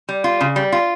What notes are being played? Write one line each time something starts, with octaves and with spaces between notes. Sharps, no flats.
G3
F4
C#3
G3
F4